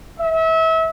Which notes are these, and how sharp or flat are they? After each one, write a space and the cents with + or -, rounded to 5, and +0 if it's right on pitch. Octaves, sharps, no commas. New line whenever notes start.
E5 -30